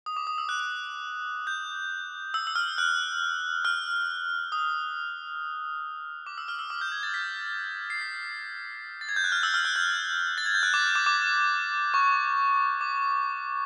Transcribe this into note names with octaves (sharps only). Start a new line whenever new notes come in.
D#6
D6
D#6
E6
F#6
F#6
G6
E6
E6
F6
F#6
F6
D#6
D6
E6
F6
E6
D6
G6
G#6
A6
B6
C7
B6
A6
G#6
G6
F#6
F6
E6
F6
F#6
G6
A6
G#6
G6
F#6
D6
D6
D6
C#6
D6